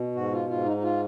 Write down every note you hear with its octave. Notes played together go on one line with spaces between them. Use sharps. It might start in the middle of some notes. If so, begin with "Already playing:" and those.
Already playing: B2
G#2 F#4
F4
G#2 F4
D#4
D#4
F4